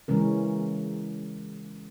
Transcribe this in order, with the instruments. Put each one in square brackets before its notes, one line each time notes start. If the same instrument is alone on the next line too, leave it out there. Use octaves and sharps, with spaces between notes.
[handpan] C#3 E3 G#3 C#4 A#4